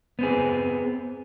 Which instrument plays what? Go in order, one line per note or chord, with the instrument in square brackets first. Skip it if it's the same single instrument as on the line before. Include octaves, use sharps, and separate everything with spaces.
[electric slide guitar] B3 C4 G#4